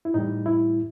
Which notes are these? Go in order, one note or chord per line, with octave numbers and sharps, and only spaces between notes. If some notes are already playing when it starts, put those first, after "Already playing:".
E4
A2 E3 G3 D#4
E4